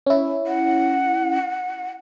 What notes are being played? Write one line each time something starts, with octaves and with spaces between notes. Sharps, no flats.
C#4 E4
F#5